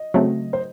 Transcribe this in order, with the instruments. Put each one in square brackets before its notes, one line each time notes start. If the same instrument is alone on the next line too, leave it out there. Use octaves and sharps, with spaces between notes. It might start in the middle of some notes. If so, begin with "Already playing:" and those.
Already playing: [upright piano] D#5
[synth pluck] C#3 F#3 A3 C4
[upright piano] C5